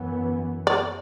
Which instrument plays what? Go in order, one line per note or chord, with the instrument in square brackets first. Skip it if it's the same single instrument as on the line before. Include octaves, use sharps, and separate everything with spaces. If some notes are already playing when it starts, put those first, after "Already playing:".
Already playing: [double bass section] F#2 E3 B3
[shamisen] D5